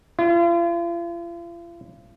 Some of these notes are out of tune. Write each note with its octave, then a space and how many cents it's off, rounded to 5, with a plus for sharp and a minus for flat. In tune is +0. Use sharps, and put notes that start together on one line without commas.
F4 -40